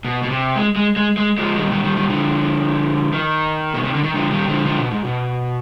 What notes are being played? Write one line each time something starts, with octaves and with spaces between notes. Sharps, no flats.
B2
B2
C3
G#3
G#3
G#3
G#3
F3 G#3
D#3 G3
D#3 G3
D#3 G3
D#3 G3
D3 F3
D#3
B2
C3
D3
D#3
D3 F3
D#3 G3
D3 F3
D3 F3
B2
G#2
B2